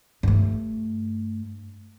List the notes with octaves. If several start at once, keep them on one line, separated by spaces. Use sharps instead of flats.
G2 A3